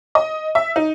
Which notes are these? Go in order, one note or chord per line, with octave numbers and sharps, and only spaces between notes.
D#5
E5
D#4